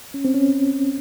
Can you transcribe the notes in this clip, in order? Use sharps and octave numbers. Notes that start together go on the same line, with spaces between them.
C#4
C4
C#4